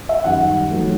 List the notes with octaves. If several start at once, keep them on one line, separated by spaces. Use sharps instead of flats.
E5
F#2 D#3 G3 F#5
D#3 F#3 A3